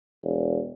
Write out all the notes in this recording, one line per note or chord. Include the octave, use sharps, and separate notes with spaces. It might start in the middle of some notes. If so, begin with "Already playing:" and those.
E1